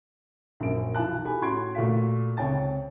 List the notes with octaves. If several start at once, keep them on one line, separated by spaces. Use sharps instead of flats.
A#1 F#2 A#3 D7
B1 E3 F4 A5 F#6
F#4 G4 A4 G#5 B5
A2 C#4 F#4 C6 G#6 D7
A#2 A3 F#4 F5 B6
C#2 C3 C#5 G5 A5 A6